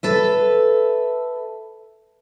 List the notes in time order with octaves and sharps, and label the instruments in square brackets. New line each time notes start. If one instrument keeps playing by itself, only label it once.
[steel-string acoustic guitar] A4 B4 E5